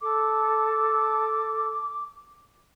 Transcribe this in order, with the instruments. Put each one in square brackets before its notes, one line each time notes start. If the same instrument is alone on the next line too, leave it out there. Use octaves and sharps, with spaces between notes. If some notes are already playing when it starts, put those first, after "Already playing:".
[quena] A4 [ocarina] D6